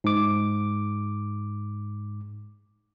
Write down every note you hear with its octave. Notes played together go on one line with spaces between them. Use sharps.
G#2 D6